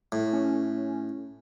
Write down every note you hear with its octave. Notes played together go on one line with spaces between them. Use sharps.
A2
C#4